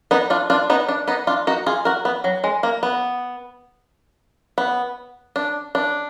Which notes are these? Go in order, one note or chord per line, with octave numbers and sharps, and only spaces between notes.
B3 D#4
D4 F4
D4 F4
B3 D#4
D4
B3 D#4
D4 F4
D#4 F#4
F4 G#4
F#4 A#4
B3
F#3
G#3
A#3
B3
B3
D4
D4